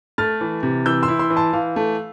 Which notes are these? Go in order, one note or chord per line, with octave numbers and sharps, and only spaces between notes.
A3 F6 A6
E3
C3
E3 E6 G6
C6 E6
E4
C6 E6
E3
A5 C6
E3 F5
A3